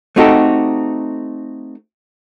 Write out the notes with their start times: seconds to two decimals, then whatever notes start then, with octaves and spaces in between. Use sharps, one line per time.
0.16 A3 C4 D#4 F#4 G4 A4